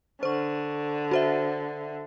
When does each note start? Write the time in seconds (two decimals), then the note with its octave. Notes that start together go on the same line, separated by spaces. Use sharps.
0.23 D3 C5 C#6
1.11 F#4 C5 E5